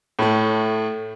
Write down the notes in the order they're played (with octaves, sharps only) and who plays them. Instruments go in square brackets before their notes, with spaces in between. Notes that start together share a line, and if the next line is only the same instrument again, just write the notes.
[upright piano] A2 A3